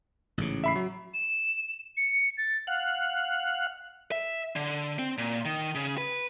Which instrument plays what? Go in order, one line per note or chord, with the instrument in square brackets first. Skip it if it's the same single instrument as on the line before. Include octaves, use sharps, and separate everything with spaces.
[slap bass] A1 G#2 C#3
[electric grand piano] E5 B5 C7
F#3
[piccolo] E7
C#7
A6
[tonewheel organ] F5 F#5 F#6
[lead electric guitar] E5
D3
C4
A#2
D#3
C#3
B4